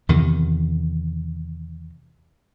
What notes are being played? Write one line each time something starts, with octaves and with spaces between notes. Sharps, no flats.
E2 C3 D#3